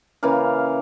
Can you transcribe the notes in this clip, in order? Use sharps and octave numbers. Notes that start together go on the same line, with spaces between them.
C#3 E3 A#3 F5